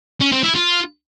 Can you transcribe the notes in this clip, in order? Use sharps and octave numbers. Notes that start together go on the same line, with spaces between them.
C#4
C4
E4
F4